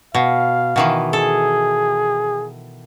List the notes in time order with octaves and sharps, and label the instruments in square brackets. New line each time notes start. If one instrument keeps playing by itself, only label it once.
[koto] B2 [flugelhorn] F5
[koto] B2 D#3 E3
[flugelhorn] G#4 [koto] A4